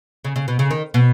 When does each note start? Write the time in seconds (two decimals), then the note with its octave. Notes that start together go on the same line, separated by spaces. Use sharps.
0.24 C#3
0.36 C#3
0.48 B2
0.59 C#3
0.71 D#3
0.94 B2